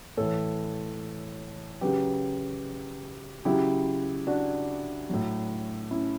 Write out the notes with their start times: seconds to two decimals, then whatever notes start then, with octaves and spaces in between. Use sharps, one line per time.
0.17 A2 E3 A4 C#5
1.81 C#3 F#3 G4 B4
3.45 C#3 F#3 E4 G4
4.27 D4 F#4
5.09 A2 F#3
5.91 C#4 E4